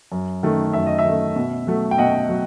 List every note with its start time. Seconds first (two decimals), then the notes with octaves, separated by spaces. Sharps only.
0.12 F#2
0.43 D#3 A3
0.73 F#2 E5
0.86 D#5
0.99 E5
1.05 D#3 A3
1.36 B2
1.67 F#3 A3
1.91 G5
1.98 B2 D#5 F#5
2.29 F#3